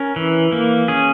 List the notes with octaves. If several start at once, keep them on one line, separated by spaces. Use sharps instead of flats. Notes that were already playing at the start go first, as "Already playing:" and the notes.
Already playing: C#4 A#4
E3
A#3
C#4 G#4